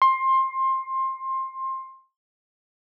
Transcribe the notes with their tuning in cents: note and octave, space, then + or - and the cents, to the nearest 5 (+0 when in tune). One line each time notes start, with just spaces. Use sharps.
C6 +20